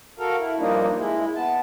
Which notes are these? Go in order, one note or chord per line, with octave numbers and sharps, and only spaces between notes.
F#4 A4 A#4 F5
E4
G2 F3 G3 A#3 D4 D#4
G#3 E4
B3 A5